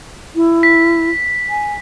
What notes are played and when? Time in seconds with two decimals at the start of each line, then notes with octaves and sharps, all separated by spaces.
0.35 E4
0.63 B6
1.50 G#5